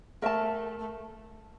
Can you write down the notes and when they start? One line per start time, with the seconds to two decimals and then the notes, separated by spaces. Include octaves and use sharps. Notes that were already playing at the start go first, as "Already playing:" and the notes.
0.22 A3 A#4 E5 A5
0.79 A3